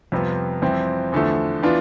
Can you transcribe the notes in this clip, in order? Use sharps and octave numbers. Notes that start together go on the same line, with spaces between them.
F2 C3 G3 B3 F4
F2 E3 G3 C4 E4
E2 D3 F3 A3
E3 B3 D4 F4